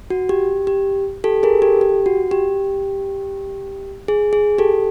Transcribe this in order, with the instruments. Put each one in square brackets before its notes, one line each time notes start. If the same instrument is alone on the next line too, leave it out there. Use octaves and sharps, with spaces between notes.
[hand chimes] F#4
G4
G4
G4 A4
G#4 A#4
G4 A4
G4
F#4
G4
G#4
G#4
G4 A4